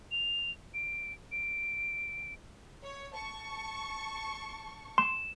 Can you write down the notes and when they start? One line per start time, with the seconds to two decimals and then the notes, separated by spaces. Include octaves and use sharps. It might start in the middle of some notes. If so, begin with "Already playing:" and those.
0.11 F7
0.74 D7
1.32 D7
2.84 C#5
3.15 A5 C#6
4.98 C6 E7